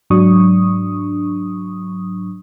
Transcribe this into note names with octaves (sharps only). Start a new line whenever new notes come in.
G#2 F#3 D4 C#6 D#6